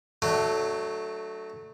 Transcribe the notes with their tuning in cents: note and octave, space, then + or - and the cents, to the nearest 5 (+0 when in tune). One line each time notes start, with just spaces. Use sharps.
F#3 +0 A3 +0 D4 +35